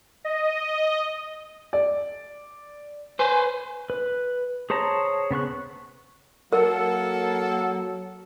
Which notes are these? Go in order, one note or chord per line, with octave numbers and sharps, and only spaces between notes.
D#5
D5
B4 C5 G#5
B4
G#4 C5 C#5 A5 A#5
C#3 B3 C#6 F#6
F#3 A#3 A4 A#4 F#5